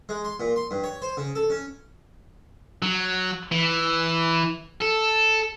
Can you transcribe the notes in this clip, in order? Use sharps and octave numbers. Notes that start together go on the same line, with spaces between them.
G#3
C6
A#2
C6
G2
C#5
C5
C#3
A4
C#4
F#3
E3
A4